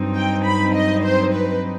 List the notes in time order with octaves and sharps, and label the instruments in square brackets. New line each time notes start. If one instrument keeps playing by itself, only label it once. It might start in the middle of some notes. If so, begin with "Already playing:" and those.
Already playing: [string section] G2 F#3 C4 D#4
G5
B5
D#5
C5
B4